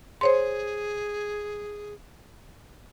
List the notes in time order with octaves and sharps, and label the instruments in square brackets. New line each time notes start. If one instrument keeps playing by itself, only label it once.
[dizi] G#4 [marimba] C5 C#5 C6